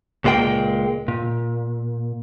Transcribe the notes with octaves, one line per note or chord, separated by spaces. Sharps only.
C#2 A#2 G#3 A#3 G5
A#2